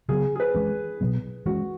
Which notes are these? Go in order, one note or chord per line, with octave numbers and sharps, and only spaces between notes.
C#3 F#3 B3 G#4
G#4
B4
E3 G#3 C#4
B2 F#3 B3
E3 G#3 C#4 F#4